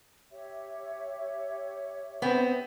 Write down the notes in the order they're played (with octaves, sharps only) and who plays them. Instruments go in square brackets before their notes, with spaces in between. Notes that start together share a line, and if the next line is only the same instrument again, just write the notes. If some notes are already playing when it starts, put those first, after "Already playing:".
[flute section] G4 C#5 E5
[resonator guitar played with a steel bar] B3 C4